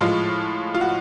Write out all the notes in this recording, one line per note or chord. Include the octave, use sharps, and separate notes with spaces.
A2 F3 G#3 F4
F4
F#4